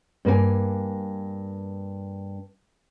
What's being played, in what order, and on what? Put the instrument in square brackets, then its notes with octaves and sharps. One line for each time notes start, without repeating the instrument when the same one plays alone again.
[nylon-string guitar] G2 A#3 B4 G#5